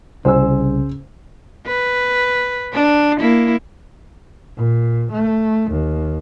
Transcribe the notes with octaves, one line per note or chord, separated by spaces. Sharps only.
C2 C#3 C5 G#5 E6
B4
D4
A#3 E4
A#2
A3
D#2